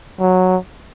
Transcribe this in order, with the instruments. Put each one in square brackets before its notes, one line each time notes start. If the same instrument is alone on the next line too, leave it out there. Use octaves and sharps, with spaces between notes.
[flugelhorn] F#3